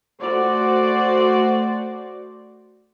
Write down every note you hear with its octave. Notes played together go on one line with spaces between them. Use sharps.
A3 F#4 C5 D5